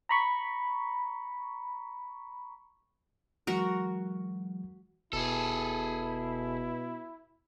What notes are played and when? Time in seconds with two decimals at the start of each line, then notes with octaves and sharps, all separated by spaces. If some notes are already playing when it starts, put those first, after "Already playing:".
0.09 A#5 B5 C#6
3.47 E3 F#3 G#3 F#4 A#4
5.13 E1 B2 E4 G#4 A4